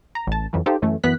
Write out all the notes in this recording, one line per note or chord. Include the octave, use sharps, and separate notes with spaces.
A#5
A1 A5
F2 E3 F#3
D#4 F4 G4 A4 C5
F#2 E3 A3 C#4
F#2 E3 B3 F#6 B6